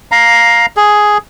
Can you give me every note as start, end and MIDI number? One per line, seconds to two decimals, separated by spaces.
0.12 0.66 77
0.12 0.66 82
0.77 1.18 68